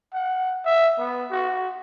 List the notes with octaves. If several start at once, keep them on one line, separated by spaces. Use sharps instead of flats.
F#5
E5
B3
F#4